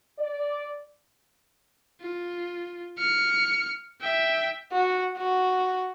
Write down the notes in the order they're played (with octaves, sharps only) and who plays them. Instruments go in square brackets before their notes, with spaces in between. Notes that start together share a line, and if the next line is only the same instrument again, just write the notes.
[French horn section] D5
[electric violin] F4
F6 C#7
E5 G5
[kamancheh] F#4
F#4